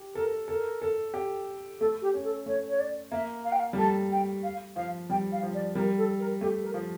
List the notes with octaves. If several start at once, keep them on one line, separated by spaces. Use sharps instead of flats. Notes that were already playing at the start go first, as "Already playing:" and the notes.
Already playing: G4
A4 A#4
A4 A#4
A4
G4
A3 A4
G4
C#4
A4
A3 C#5
C#5
D5
A#3 E5
F5
G5
F5
G3
A3 A5
G5
F5
F3 F5
G3 G5
F5
F3
D5
G3 A#4
A4
A#4
A3 G4
A#4
F3